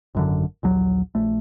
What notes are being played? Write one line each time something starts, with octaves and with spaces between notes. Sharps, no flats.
G#1 F#2 D3
A#1 D#2 F#3
A#1 A3